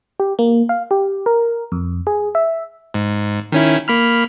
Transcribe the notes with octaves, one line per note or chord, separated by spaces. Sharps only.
G4
A#3
F5
G4
A#4
F2
G#4
E5
G#2
D#3 C#4 E4
A#3 B5 F6